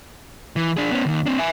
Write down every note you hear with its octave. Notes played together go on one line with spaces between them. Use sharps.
E3
D4 G#4
B3 C#4
D#2 D#3
C4 D4
E5 G#5